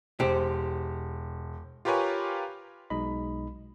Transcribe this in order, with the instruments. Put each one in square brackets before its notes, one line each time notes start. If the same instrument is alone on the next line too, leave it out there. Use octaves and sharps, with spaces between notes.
[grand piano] E1 [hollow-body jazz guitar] G4 C5
[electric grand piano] F4 G4 A#4 B4 C#5 G#5
[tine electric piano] B1 B2 G#3 D#4 D#5 B5